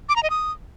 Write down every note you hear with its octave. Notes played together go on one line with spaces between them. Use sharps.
D6
A#5
D#5
D#6